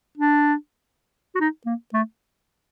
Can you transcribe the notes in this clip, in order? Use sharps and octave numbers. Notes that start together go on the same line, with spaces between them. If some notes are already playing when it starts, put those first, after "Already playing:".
D4
F#4
D#4
A#3
A3